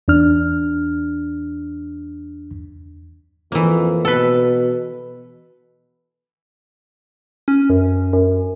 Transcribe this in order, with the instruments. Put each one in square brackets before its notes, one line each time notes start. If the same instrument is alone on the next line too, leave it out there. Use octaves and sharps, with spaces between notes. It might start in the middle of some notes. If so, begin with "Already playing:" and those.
[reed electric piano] E2 D4 F6
[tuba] F2 [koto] E3 A#3
[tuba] B2 [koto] A4 B4
[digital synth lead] C#4
F#2
F#2